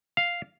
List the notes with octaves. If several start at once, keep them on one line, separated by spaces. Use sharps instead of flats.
F5